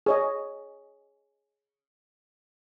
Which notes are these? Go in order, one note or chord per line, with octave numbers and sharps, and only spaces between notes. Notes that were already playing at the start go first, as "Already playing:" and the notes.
G#4 C#5 D#5